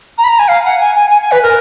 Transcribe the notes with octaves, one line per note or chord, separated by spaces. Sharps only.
A#5
B5
A#5
G#5
F5
F#5
G#5
G#5
G#5
G#5
B4
A#4